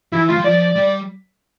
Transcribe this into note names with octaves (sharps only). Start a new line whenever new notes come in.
E3 E4
A3 F4
G3
F3 D5
G3